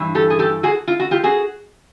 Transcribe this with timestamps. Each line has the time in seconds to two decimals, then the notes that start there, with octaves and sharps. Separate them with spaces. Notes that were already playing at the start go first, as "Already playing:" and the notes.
Already playing: G2 E3
0.15 G4 A4
0.30 G#4
0.39 G4 A4
0.63 F#4 G#4
0.88 F4
1.00 F#4
1.11 F4 G4
1.24 F#4 G#4